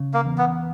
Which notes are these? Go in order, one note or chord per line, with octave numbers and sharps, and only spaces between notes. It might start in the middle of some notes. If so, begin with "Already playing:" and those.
Already playing: C#3
A#3
E2
B3